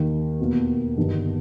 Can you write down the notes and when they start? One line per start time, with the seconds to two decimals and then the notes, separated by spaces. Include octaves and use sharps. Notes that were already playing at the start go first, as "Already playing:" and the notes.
Already playing: D#2 D#3 A#3
0.40 E2 B2 A#3
0.97 G1 G2 D#3